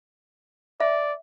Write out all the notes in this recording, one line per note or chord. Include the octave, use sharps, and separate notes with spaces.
D5 E5